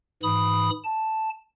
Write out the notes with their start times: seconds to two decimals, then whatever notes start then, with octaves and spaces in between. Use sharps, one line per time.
0.23 G#2 E3 B5 D#6
0.84 A5